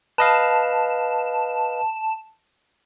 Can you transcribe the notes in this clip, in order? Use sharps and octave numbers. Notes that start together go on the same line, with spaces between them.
B4 D#5 F5 A5